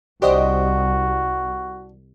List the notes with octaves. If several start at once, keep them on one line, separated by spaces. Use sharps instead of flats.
C2 D4 F#4 G4 C5 D#5